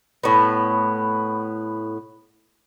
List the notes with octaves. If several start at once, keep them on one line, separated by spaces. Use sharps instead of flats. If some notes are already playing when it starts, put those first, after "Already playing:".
A2 B3